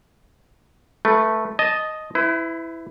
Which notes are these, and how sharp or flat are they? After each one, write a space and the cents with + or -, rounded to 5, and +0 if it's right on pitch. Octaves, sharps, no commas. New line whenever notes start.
A3 +0 B4 -20
D#5 +0 A5 -10
E4 +0 B4 +40